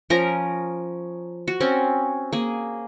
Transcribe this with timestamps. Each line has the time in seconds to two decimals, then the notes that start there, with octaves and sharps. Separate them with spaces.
0.10 F3 C#4 A#4 A#5
1.48 F#4
1.60 C4 C#4
2.33 A#3 G#4